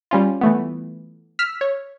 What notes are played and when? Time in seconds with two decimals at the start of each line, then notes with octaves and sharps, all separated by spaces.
0.11 G3 C#4 F4
0.41 E3 A3 B3
1.39 E6 F6 B6
1.61 C#5